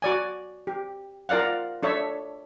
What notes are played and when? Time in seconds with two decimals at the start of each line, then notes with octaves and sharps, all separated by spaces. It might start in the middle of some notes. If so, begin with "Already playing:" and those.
0.02 F#4 D5 G#5
0.67 G4
1.29 F4 A#4 D5 F5 F#5
1.83 D4 A4 C#5 E5